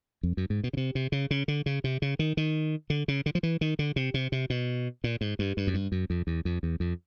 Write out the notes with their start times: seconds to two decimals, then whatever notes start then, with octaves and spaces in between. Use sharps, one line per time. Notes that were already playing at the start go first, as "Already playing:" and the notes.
0.23 F2
0.37 F#2
0.50 G#2
0.64 B2
0.73 C#3
0.77 C3
0.95 C3
1.12 C#3
1.31 C#3
1.48 D3
1.66 C#3
1.84 C3
2.02 C#3
2.19 D#3
2.37 D#3
2.90 D3
3.08 C#3
3.26 D3
3.35 F3
3.43 E3
3.61 D#3
3.79 D3
3.96 C3
4.14 C3
4.32 C3
4.50 B2
5.04 A#2
5.21 G#2
5.39 G2
5.57 G2
5.67 F#2
5.74 G2
5.92 F#2
6.10 F2
6.27 E2
6.45 F2
6.63 E2
6.80 F2